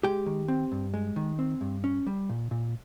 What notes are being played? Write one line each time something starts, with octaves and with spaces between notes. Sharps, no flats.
G#3 G4 G5
D#3
C4
G2
G#3
D#3
C4
G2
C#4
G3
A#2
A#2